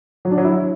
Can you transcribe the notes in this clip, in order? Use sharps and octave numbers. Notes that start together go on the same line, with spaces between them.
F#3
D4
F#3
E4